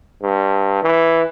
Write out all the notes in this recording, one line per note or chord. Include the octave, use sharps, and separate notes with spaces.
G2
E3